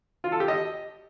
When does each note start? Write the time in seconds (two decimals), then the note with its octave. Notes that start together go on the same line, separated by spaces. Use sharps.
0.24 F4
0.32 A4
0.40 G4
0.48 D#5